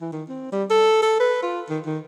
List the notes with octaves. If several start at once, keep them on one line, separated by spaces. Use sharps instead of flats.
E3
D#3
C4
G3
A4
A4
B4
F4
D#3
D#3